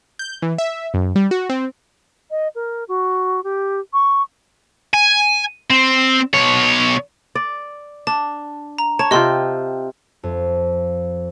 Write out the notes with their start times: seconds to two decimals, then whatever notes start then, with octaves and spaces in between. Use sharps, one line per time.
0.19 G6
0.42 E3
0.58 E5
0.94 F#2
1.16 G3
1.31 F#4
1.49 C4
2.31 D#5
2.55 A#4
2.88 F#4
3.44 G4
3.93 C#6
4.94 G#5
5.70 C4
6.33 B2 C#5
7.35 D5
8.07 D4 A5
8.78 A#5
8.99 C#5 A5
9.11 C3 C4 F4 D#5 C6
10.23 F2